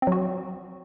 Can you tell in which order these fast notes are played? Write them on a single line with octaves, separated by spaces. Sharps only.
C4 F#3 F#4